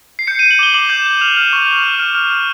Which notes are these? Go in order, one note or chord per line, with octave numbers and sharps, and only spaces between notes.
C7
G6 C#7
G6 D#7
F#7
D6 G7
D6 F#7
G6
E7
G6
F6 F7
F6
C#6
C#6
F6
F6
F6
F6